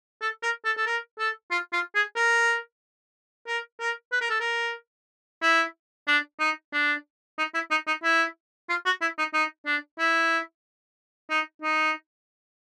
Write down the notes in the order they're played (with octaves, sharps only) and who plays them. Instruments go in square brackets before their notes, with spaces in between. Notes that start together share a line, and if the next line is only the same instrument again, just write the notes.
[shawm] A4
A#4
A4
A4
A#4
A4
F4
F4
G#4
A#4
A#4
A#4
B4
A#4
A4
A#4
E4
D4
D#4
D4
D#4
E4
D#4
D#4
E4
F4
F#4
E4
D#4
D#4
D4
E4
D#4
D#4